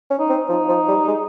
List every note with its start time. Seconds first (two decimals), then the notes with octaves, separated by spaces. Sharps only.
0.10 C#4
0.19 D#4
0.30 C4
0.49 F3 D#4
0.68 F3
0.88 G3
1.08 G#3